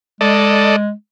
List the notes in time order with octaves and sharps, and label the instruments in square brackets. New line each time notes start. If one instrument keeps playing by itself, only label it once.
[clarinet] G#3 [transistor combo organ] A4 D5 D#5